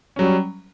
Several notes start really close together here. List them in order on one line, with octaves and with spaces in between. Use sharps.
C#4 F#3 G3